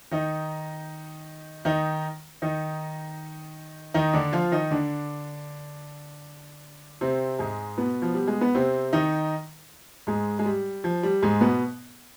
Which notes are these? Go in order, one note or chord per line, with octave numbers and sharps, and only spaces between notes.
D#3 D#4
D#3 D#4
D#3 D#4
D#3 D#4
D3 D4
F3 F4
D#3 D#4
D3 D4
C3 C4
G#2 G#3
B2 B3
F3
G3
G#3
B3
C3 C4
D#3 D#4
G#2 G#3
G#3
G3
F3
G3
G#2 G#3
B2 B3